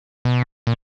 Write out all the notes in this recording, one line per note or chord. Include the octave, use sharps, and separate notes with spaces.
B2
A#2